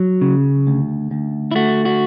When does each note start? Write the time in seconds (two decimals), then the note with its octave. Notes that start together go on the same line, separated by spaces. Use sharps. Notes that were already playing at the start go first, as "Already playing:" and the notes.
Already playing: F#3
0.21 C#3
0.67 D2
1.11 D2
1.51 E4
1.55 A3 F#4
1.85 F#4